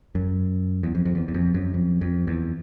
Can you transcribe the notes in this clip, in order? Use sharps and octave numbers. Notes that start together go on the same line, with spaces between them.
F#2
E2
F2
F2
E2
E2
F2
F#2
F2
F2
E2